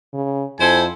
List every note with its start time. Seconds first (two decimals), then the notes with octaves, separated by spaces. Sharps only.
0.14 C#3
0.60 F2 E4 A4 C5 G#5